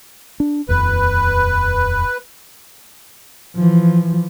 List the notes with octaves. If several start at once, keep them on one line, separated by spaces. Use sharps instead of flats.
D4
D#1 F2 B4
E3 F3